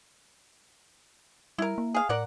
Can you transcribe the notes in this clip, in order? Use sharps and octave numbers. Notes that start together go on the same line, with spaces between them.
G3 E4 A#4
A#3
G#4 F5
A2 A#4 D5 F#5